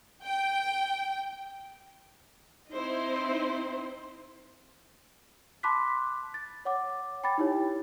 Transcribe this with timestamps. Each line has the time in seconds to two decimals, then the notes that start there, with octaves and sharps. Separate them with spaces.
0.24 G5
2.73 C4 D#4 E4 C5
5.63 A5 B5 C6 D6 F#6 B6
6.34 A6
6.65 C#5 F#5 D6
7.24 G5 B5 D6 A6
7.38 D#4 E4 G4 C#5